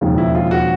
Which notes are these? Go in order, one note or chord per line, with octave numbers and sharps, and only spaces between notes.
E1 D#2 C#3 F3
E4
F4
F#4